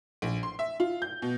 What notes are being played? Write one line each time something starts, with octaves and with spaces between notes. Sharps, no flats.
A#1
C6
E5
F4
G6
B2